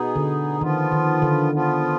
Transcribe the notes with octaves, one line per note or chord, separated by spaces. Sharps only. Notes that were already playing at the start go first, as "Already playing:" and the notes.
Already playing: B2 B3 D#4 G#4
D3
D#3 F3 B3 F4
D#3
D3
F3 B3 F4